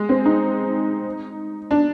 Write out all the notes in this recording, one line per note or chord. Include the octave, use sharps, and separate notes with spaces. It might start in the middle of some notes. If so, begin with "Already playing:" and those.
Already playing: G#3
C4
D#4
D4